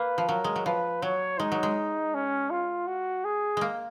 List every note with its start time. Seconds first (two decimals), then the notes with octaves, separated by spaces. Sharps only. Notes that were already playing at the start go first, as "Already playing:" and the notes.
Already playing: A#3 B4
0.18 F3
0.28 F#3 A#4
0.44 G#3
0.56 F#3
0.66 F3 B4
1.02 F#3 C#5
1.39 G#3 D#4
1.52 F#3
1.63 G#3
2.14 C#4
2.51 F4
2.87 F#4
3.25 G#4
3.57 G#3 A#3